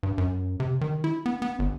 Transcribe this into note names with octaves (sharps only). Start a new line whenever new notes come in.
G2
F#2
C3
D#3
E4
B3
B3
G1